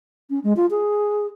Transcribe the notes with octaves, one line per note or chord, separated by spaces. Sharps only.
C#4
G#3
F4
G#4